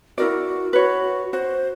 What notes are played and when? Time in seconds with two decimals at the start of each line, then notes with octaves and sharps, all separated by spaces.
0.18 E4 F#4 A#4 D5
0.73 F#4 B4 C#5
1.33 F#4 C5